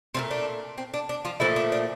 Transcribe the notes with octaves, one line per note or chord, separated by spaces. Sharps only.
A#2 F3 A3 C4
D4
C4
D4
D4
F3 F4
A#2 E3 F3 A3 E4
D4
D4